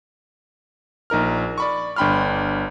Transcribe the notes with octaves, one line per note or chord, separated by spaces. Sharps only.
A#1 D#4 A#4 F6
D5 B5 C#6
G1 D4 G5 B5 C6 F6